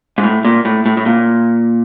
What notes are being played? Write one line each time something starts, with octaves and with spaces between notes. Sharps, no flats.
G#2
A2
A#2
A2
A2
A2
A#2